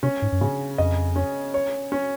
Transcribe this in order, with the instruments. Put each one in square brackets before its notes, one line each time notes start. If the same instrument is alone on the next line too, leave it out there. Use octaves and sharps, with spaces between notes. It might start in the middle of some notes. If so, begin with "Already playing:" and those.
[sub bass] C3 [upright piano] C#4
[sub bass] G#2
F#2
[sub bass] G#2 [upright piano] C#3
[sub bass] F2 [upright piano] D#5
[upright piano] C#4
C#5
C#4